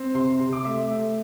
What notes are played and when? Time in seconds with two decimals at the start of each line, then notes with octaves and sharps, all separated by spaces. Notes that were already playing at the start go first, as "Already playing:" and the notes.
Already playing: C4
0.14 C3 C6
0.39 C3 C6
0.53 D6
0.65 A3 E5
0.90 A3